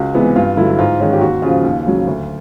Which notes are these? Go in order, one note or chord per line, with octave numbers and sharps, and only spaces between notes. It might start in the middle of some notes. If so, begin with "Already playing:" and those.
Already playing: C#2 F#4
C3 E3 G#3 B3
G2 F4
D3 F#3 E4
G#2 F4
D#3 G#3 C#4 F4
G4
D#2 F#4
C#3 F3 F4
D#2
C#3 F#3
D2